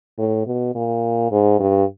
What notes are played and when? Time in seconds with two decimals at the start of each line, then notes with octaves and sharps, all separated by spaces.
0.19 A2
0.47 B2
0.75 A#2
1.31 G#2
1.60 G2